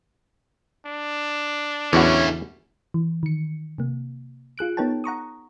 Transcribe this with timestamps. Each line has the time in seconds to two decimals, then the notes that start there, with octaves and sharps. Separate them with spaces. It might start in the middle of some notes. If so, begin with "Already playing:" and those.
0.86 D4
1.93 E2 D3 C#4 E4 F#4
2.94 E3
3.23 D#3 C#7
3.78 C3 A#3
4.58 F4 G#4 F#6 D7
4.77 B3 D#4 A#4 C#5 G5 A5
5.04 F#5 A#5 C#6 D#6